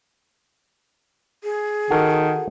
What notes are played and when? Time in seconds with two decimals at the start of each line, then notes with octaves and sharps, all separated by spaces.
1.44 G#4
1.90 D#3 F#4 A4 A#4